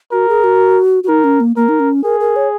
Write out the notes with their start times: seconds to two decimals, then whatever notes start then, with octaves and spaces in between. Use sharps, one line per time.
0.12 F#4 A#4
0.29 G#4
0.44 F#4
1.04 F#4
1.08 D#4 A#4
1.24 C#4
1.40 A#3
1.56 A#3 A#4
1.69 D#4
1.80 C#4
2.04 G#4 A#4
2.20 A#4
2.36 C#5